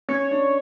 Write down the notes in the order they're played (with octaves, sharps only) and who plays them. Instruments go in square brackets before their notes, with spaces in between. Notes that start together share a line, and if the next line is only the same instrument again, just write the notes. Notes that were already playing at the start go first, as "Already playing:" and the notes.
[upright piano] C#4 [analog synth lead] C#5
[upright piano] D4